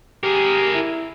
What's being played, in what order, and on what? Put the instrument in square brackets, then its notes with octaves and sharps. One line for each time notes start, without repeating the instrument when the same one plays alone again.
[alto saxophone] G4 [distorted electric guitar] G#4 A#4
[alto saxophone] E4